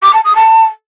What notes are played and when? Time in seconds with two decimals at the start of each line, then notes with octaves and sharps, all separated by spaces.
0.02 D6
0.13 A5
0.24 D#6
0.35 A5